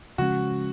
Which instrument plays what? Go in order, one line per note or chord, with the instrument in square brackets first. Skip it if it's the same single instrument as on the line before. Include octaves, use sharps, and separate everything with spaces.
[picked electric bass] C#3 F3 G#3 C#4 [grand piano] F#4